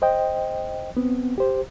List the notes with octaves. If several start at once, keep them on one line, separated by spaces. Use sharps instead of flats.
C5 D#5 G5
B3 C4
G4 C5